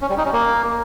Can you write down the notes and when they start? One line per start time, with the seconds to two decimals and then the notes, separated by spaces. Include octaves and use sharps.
0.02 C#4
0.09 G3
0.17 D#4
0.25 C#4
0.33 A#3